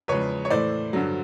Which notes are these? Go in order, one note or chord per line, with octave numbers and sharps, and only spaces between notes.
E2 C#3 F3 G#3 B4 C#5
C#5
A2 E3 A3 C5 D5
G2 D3 F#3